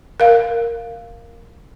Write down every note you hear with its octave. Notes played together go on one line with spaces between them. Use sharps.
A#4 F5